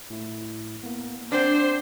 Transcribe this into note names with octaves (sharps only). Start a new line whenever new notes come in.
A2 E4
A#3 B3
C4 D4 C5 F#5 D6